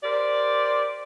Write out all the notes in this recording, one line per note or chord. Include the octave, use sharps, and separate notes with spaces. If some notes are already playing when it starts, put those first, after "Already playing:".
G4 A#4 C5 D5